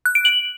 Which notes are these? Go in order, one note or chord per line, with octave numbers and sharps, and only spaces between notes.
F#6
D7
F#7